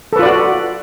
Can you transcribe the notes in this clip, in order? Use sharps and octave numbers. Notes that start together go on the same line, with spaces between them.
F4 F#4 A4 B4 D5